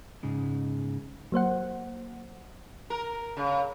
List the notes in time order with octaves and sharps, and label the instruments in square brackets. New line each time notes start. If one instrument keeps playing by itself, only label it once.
[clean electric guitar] G#2 C#3 G#3
[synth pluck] F#3 A#3 C5 F#5
[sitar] A#4
C#3